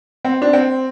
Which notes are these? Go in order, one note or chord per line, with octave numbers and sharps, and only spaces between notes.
C4
D4
C4